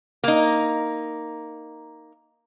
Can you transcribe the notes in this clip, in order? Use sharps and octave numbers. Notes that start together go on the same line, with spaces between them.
A#3 D#4